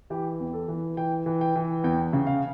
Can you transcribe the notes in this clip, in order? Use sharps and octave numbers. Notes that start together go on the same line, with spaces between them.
E3 G4
E2
A4
E3
E3 G5
E3
G5
E3
E2 G5
C#3
F5